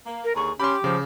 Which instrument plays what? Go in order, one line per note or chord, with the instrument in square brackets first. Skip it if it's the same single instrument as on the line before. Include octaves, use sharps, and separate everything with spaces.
[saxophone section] A#3
[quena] A#4
[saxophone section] D#2 D3 G#4 [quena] C#6
[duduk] C#4 [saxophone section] G4 [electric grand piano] B5 C6 [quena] D6
[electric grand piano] C#3 [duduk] F3